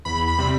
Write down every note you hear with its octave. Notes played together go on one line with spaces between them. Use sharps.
E2 B5
B5
C3 G3 C4